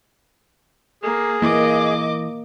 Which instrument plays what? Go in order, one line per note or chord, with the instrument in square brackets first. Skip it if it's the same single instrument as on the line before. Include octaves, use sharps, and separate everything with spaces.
[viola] A#3 [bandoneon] G#4
[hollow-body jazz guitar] E3 [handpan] A#3 [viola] D#5 D6